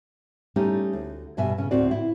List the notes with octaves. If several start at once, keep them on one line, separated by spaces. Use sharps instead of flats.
G3 A3 C#4 D#4 G4
D2
G2 B2 E5 G#5
C#3 C#4
D2 A2 C4 F#4 D5
E4